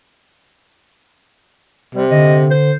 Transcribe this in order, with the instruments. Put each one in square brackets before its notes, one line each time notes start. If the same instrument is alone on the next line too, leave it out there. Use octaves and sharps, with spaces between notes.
[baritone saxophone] C3 [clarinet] G3
[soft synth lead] D3 [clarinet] D#5
[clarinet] C5